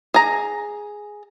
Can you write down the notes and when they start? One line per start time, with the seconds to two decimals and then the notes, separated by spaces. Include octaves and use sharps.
0.14 G#4 A#5